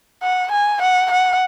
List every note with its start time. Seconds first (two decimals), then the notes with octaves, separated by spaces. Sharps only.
0.22 F#5
0.52 G#5
0.82 F#5
1.11 F#5